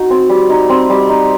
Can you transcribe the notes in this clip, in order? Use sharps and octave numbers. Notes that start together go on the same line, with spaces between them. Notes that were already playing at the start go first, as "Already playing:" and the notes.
Already playing: D#4 F#4
C4
G3
D#4
C4
G3
D#4